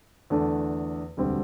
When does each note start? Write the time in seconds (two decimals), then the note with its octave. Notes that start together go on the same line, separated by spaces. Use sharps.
0.30 E2 D3 A3 D4
1.17 E1 D2 D3 G3 C4